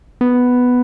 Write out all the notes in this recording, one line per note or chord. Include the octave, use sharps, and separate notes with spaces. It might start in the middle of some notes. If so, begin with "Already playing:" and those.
B3